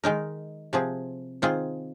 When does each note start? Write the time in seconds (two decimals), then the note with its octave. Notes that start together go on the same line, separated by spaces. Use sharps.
0.04 D#3 G#3 D#4 A#4
0.73 C3 F3 C4 G#4
1.42 D#3 C4 F4 G#4